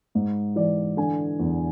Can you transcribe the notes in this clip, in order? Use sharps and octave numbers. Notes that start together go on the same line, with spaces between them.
G#2
E3 D5
D3 G#5
E2